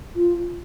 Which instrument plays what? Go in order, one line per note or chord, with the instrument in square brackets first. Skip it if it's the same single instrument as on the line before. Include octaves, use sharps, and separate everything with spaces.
[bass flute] F4